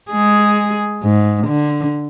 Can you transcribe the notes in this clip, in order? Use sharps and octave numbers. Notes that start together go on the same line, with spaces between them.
G#3 G#4
G#2
D3